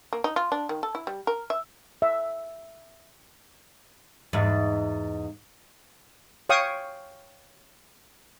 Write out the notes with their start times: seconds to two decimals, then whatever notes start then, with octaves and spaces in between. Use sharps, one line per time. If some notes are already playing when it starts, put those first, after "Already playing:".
0.13 A#3
0.24 D#4
0.36 F4
0.52 D4
0.69 D#3
0.83 A4
0.95 E4
1.07 G3
1.27 A#4
1.50 E5
2.02 E5
4.33 E2 G#2
6.49 C#5 F5 G5 C#6 D#6